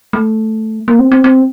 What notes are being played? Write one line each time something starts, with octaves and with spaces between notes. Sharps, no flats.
A3
A#3
C4
C4
C4